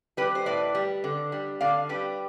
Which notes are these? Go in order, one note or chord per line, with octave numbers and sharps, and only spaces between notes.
G3 G4 B4
C5
A2 B4 D5
G3
D3
G3
D3 D5 F5
G3 G4 B4